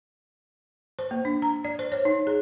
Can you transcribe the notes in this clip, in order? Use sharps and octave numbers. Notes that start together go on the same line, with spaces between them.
C5
A#3
D4
A#5
D5
C5
C#5
D#4
G#4